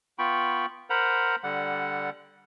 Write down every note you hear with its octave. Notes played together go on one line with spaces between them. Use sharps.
B3 F4 G5 B5 C#6
A#4 C5 F#5 A#5 B5
D3 G3 F#5